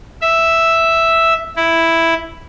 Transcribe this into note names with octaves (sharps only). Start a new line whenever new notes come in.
E5
E4